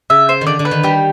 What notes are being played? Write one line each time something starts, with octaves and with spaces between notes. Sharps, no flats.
C#3 E5
C5
D#3
D3 D5
D3
B4
D#3
G3 G4